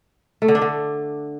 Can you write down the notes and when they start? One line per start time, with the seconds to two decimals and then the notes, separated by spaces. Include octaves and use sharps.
0.42 A3
0.48 D3
0.55 D4
0.62 D3